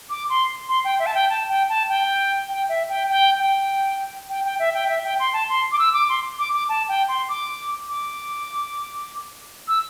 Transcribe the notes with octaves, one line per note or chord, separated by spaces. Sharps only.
D6
C6
C6
G5
E5
A5
G5
A5
G5
A5
G5
G5
E5
G5
G5
G5
G5
G5
E5
G5
E5
G5
C6
A5
C6
D6
E6
D6
C6
D6
D6
A5
G5
C6
D6
D6
E6